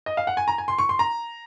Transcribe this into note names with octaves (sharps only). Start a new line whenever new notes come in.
D#5
F5
F#5
G#5
A#5
G#5
C6
C#6
C6
A#5